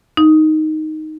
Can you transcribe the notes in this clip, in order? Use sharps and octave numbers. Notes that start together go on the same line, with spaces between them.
D#4